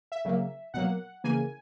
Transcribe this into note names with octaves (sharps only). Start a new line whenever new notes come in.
E5
C#3 F#3 A#3
B2 F#3 A#3 F#5
C#3 E3 A#3 G#5